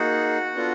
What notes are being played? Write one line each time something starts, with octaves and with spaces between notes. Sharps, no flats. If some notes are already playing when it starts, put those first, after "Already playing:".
Already playing: A#3 D#4 F#4 G#4 F#5
B3 D4 F4 A4